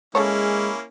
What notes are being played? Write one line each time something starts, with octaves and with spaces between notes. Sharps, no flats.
C#3 G#3 A#3 C#4 E4 A4 C#5